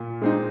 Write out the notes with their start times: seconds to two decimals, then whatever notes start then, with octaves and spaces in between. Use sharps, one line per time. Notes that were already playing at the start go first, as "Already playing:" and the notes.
Already playing: A#2
0.22 G#3 C4 D#4